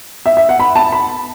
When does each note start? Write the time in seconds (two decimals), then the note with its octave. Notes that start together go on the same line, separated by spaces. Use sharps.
0.26 E5
0.37 E5
0.49 F#5
0.59 B5
0.76 A5
0.92 B5